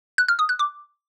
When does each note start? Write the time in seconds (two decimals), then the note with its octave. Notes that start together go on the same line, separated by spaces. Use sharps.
0.18 F#6
0.28 F6
0.39 D#6
0.49 F#6
0.59 D6